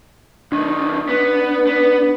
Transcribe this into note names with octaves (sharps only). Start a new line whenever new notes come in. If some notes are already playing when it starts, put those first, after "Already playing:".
B1 D#3 D4
B3
B3